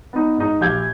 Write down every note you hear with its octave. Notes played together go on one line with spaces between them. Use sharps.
B3 D#4
G#2 D#4
A#1 G4 F5 G6 G#6